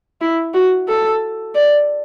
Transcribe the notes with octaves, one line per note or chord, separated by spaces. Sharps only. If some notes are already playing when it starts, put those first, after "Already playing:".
E4
F#4
A4
D5